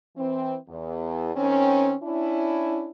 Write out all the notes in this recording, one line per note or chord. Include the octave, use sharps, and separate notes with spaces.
E3 C4
E2
D#3 C4 C#4
C#4 D4 E4